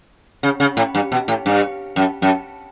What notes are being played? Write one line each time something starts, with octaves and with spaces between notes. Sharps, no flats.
C#3
C#3
A2
G2
B2
A2
G2
F#2
F#2